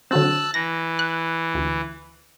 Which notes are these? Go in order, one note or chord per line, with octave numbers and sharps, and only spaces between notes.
D3 F#3 C4 A5 E6 F#6
E3 A#6
F#6
D2